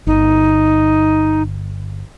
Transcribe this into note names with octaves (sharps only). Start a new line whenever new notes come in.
G1 D#4